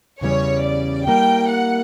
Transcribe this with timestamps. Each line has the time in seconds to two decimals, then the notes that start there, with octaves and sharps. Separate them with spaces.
0.21 E2 C#3 E3 G3 C#4 C#5
0.64 D5
1.07 G3 A#3 E4 A#4 G5
1.51 F#5